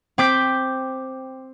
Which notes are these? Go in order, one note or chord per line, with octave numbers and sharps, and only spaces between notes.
C4 G5 D6 G6 B6